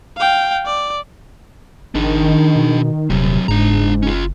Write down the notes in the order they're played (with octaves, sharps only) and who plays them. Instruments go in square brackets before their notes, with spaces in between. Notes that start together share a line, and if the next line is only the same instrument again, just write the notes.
[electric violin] F5 G5
D5
[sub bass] G#1 [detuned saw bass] D#3 [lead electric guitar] D4 G#4
[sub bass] B2
[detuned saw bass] D#1 [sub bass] C3 [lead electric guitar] F#3 C4
[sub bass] F#1 [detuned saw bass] G#2 [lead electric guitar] D4 A#5
[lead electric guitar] C#4 F4